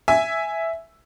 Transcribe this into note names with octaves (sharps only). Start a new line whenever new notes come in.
E5 G#5